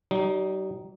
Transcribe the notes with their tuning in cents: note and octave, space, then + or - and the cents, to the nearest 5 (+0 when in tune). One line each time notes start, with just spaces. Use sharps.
G3 -40 D#4 +0